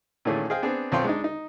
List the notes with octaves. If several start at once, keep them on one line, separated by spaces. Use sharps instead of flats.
A#2 D#3 E3 A3 C#4 G#4
G#4 C5 D#5 F5 G5
B3 C4 D4 G#4
B1 C4 F4 C#5 G5 C6
G#3 D4 D#4
D#4